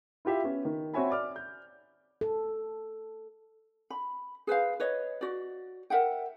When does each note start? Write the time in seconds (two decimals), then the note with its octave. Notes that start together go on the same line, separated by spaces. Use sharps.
0.25 E4 F4 G4 E5
0.44 B3 C#4
0.65 D#3
0.94 C4 F#4 C#5 E5 G#5 B5
1.11 D5 D6 F6
1.36 G6
2.21 A4
3.90 B5
4.47 G#4 B4 C5 F5
4.80 B4 C#5 D#5
5.21 F#4 D5
5.90 A#4 E5 F#5 G5